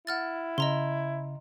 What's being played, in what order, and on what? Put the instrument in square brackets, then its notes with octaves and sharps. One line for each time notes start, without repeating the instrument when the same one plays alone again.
[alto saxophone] E4 [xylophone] F#5 F6 A6
[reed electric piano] C#3 [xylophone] D#5 A#5 C6